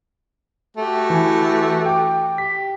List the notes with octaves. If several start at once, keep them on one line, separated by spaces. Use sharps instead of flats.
A3 F#4 G4
E3 G#5
G5 D6
G4 B6